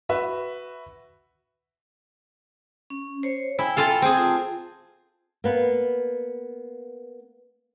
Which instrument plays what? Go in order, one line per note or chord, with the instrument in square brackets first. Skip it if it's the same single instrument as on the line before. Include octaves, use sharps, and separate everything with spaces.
[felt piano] F#4 B4 E5
[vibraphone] C#4
C5 C#5
[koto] E4 [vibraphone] G5 G#5
[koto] F4 A4 F5
C4 G#4
[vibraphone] F4 A5
[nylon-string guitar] A#3 B3